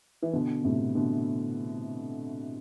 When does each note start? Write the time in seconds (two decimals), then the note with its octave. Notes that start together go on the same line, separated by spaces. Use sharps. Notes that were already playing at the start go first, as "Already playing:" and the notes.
0.22 E3
0.33 B2 D3
0.65 A2 C3
0.95 B2 D3